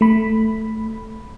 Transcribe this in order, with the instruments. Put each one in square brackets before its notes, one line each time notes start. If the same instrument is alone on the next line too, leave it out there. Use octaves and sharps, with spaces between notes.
[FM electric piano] A3 B5